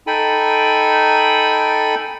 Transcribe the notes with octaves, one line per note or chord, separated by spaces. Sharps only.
D#4 A4 G5 G#5 B5